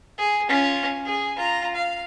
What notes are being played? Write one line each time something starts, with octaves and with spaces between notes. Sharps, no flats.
G#4
C#4 F4
G#4
F4 A#5
F5